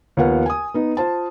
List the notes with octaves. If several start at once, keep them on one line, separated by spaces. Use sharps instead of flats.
D#2 F3 B3 F5 F#5
G#5 D#6
B3 D#4
F4 C5 A5